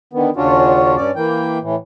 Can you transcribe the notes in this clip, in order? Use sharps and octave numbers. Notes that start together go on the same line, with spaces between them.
D3 D#3 B3
D#2 C#3 C#4 D4 F4 F#4
G2 C#4 D5
E3 A#3 G5
A2 E3